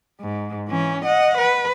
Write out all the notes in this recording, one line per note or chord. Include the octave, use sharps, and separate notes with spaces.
G#2
E3 C#4
D#5 F#5
B4